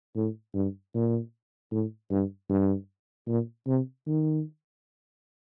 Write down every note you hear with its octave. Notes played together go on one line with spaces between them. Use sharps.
A2
G2
A#2
A2
G2
G2
A#2
C3
D#3